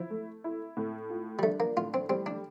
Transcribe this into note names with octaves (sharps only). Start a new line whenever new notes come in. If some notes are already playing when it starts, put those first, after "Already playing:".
Already playing: F3 E4
A3
E4
A2
F4
G3
A3 D4
A#3
A2 F4
C4
G3 C4
D4